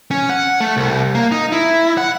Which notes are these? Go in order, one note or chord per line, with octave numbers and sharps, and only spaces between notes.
C#4
F#5
A3
C2
A#3
D#4
E4
F#5